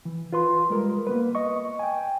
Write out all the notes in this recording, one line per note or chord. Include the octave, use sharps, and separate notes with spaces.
E3
F4 B4 C6
G3 G#3 A#4
A#3 B3 B4
D#5 C#6
G5 G#5